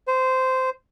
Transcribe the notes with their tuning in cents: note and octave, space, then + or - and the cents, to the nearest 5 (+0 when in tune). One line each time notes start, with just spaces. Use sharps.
C5 -15